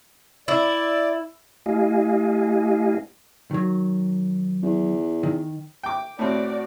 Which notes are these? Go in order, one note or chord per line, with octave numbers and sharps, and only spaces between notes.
E4 D5
A3 E4 G4 D#5 F5 G#5
D#3 F#3
E2
D#3
G5 D6
A2 C4 F#4 D5